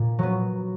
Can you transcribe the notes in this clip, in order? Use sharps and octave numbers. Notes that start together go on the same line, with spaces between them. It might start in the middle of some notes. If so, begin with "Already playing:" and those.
Already playing: A#2
F#3 B3